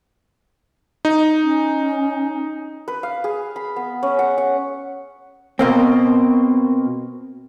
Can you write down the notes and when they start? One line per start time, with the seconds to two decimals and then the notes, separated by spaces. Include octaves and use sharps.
1.05 D#4
1.43 C#4
2.88 B4
3.03 F5
3.24 G#4
3.56 B5
3.76 B3
4.03 C#4
4.19 F#5
4.38 F#5
5.59 B2 A#3 C4